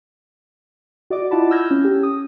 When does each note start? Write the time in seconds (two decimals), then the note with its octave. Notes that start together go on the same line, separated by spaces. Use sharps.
1.10 F#4 D5 D#5 D6
1.31 E4 F4 F#5 A5 B5
1.51 E6 F6 G6 G#6 A#6
1.71 C#4
1.84 G4
2.03 D#6